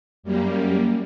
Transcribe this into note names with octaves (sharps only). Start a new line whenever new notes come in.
F#2 G3 A#3